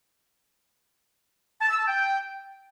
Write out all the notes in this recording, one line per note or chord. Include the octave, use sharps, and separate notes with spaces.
A5
E6
A5
G5